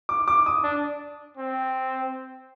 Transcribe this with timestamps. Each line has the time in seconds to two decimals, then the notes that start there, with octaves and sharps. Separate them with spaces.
0.09 D6
0.28 D6
0.46 D#6
0.64 D4
1.38 C4